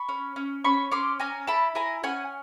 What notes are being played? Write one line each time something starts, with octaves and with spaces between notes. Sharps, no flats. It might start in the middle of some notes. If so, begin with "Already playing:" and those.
Already playing: B5 C#6
C#4
C#4
C#4 B5 C#6
C#4 C6 D6
C#4 G#5 A#5
E4 A5 B5
E4 G#5 A#5
C#4 F#5 G#5